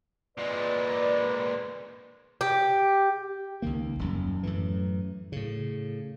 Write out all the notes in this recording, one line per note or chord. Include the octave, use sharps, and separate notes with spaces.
A#2 G#3 B4 D5
G4
C#2 D#3 A#3
D#1 F#2
F#2 A2 E3
A2 C#3